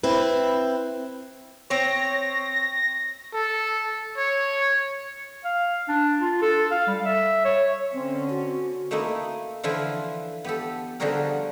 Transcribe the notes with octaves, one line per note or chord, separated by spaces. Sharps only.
C4 E4 B4
C4 C#5 A#6
A4
C#5
F5
D4
F4
A4
F5
G3
E5
C#5
D3 C4 C#4
F#4
A3 A#3 D#4 E4
D3 E3 F3 E4 F4 B4
B3 G4 A4
D3 F3 G3 F#4 G#4 A#4